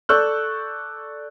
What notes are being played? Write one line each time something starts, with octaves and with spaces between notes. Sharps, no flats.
A4 D5 C#6 E6 F#6 G6